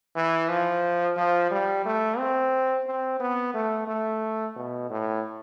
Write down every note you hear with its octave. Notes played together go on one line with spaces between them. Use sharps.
E3
F3
F3
G3
A3
C4
C4
B3
A3
A3
B2
A2